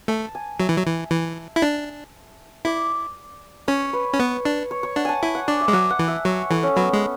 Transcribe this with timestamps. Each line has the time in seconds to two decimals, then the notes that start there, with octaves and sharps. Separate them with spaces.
0.08 A3 A5
0.35 G#5
0.60 F#3 E5
0.69 E3
0.77 F#3
0.86 E3
1.11 E3
1.56 E4
1.62 D4
2.65 E4 D5
3.68 C#4 C#5
3.93 B4
4.13 C#4
4.20 B3
4.45 D4
4.71 C#5
4.83 C#5
4.96 D4 F#5
5.05 G#5 A5
5.22 E4 G#5
5.35 F#5
5.48 D4 D5
5.61 E5
5.68 G#3
5.73 F#3 F#5
5.90 F#5
5.99 E3
6.08 E5
6.25 F#3 C#5
6.51 E3 A4
6.63 C#4
6.76 F#3 B3
6.93 G#3